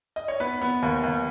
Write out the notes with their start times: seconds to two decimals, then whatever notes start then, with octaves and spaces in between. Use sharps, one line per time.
0.16 D#5
0.28 C#5
0.40 B3 B4
0.62 B3
0.82 D#2
1.03 D#2